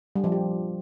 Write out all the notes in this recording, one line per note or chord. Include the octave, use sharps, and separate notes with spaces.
G3
F3
G4